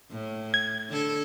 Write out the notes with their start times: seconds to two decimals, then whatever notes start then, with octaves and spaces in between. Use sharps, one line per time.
0.11 A2
0.54 G#6
0.90 D3 A4